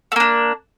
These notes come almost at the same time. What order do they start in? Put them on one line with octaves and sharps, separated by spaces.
A3 A#3 D4